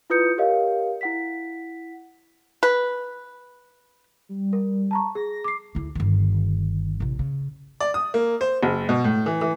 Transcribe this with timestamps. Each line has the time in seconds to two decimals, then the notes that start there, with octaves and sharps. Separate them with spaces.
0.10 E4 F4 B4 D#6 G6 C#7
0.38 G4 A#4 C#5 D#5 F5
1.01 E4 F#5 B6
2.63 B4
4.29 G3
4.53 A#4
4.91 A5 A#5 C#6
5.15 G#4 A#6
5.44 D6 C7
5.75 D2 E4
5.95 G1 D#3
7.00 A1 C3
7.19 C#3
7.81 D5
7.94 D#6
8.14 A#3
8.41 C5
8.63 F#1
8.89 B2
9.04 A2
9.26 E3
9.41 E3